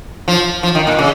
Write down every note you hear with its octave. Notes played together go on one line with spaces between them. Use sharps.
F3
F3
D#3
A#2
C#3